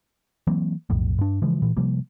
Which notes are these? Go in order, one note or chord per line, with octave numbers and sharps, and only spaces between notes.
E3 F#3 A#3 C4
B1 F2 A2
G2 D4
C#3 E3 F3 G#3
A#2 E3
C3 F3 G3 A#3